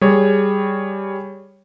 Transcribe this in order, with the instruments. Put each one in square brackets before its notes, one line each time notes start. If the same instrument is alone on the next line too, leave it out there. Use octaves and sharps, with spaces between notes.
[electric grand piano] G3 G#4 C#5